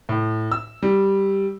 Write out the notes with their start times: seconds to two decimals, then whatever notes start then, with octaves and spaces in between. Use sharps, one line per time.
0.09 A2
0.52 E6
0.83 G3